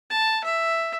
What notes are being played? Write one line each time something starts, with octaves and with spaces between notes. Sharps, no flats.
A5
E5